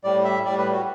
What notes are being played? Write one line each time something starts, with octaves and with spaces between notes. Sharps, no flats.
A2 G3 D5
E5
A2 G3 D5
B4
F#4